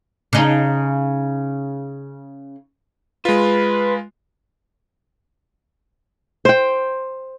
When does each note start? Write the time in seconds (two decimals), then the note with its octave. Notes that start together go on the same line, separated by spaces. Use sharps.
0.33 C#3 D#4
3.25 G#3 F4 B4
6.45 C5 G5